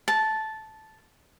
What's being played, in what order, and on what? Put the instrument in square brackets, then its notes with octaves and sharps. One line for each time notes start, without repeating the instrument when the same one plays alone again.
[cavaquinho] A5